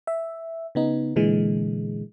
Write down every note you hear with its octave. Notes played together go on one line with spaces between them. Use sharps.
E5
C#3 B3 D#4
A#2 D3 E3 G#3